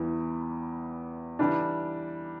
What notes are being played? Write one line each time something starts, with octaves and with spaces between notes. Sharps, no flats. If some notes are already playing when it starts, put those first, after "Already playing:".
Already playing: E2 E3 G3
E3 G3 D4